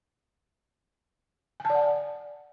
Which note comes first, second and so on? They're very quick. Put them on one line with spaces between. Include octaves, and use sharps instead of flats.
G#5 A5 D5 F#5